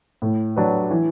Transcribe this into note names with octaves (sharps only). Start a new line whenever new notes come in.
A2
F#3 D4 B4
E3